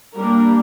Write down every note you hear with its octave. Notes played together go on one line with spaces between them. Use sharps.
G3 A#3 D4 A#4